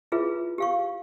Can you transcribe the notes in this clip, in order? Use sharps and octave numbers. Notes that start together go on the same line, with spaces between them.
E4 F4 G#4 B4 E5
G4 F5 C#6